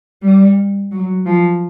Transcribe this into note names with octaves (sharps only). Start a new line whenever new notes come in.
G3
F#3
F3